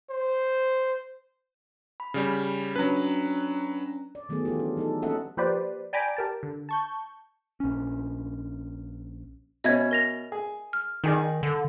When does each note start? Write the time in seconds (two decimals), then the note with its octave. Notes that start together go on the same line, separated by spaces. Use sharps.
0.10 C5
2.00 B5
2.14 C#3 G3
2.76 F#3 C#4 D4 B4 A#5
4.15 D5
4.29 D#3 F#3 A3 B3 G#4
4.45 E3 F4 G4
4.60 D4
4.77 F#3 D#4 A4
5.03 A#3 C#4 A4 D#5 E5 F#5
5.37 F3 A#3 G4 B4 C5 D5
5.93 D5 G5 G#5 A#5 B5 D6
6.17 G4 A#4 A5
6.43 D3
6.69 A5 C#6 G6
7.60 A#1 C#4
9.64 B2 C#4 D#5 E5 G#6
9.91 A#4 A#6 F7
10.32 G#4
10.73 F6
11.04 D#3 D#4 G#4 D5
11.43 D3